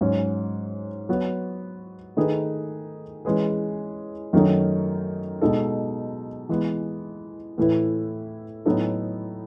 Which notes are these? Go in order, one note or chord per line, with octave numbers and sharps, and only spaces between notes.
G#2 F#3 C#4
F#3 B3 F#4 B4
D#3 A3 D#4 G#4 B4
E3 G#3 C#4 G#4 B4
F#2 D#3 F#3 A3 D#4
B2 G#3 D#4 A4
E3 G#3 B3
A2 E3 A3 E4 B4
A2 F#3 B3 D#4 A4